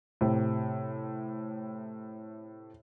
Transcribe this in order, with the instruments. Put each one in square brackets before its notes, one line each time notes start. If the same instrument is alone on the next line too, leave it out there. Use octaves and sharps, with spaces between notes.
[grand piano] A2 C3